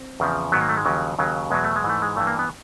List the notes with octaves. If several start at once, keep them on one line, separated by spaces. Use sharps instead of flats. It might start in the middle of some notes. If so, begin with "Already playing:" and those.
Already playing: C4
E2 C#3 F3
G#2 D#3 F#3 B3
A#3
A3
G#3
D#2 C#3 F3 F#3
D#2 C#3 F#3
E2 B2 F#3 G#3
A3
G#3
G#2 E3
A3
G#3
G2 E3 A3
A#3
B3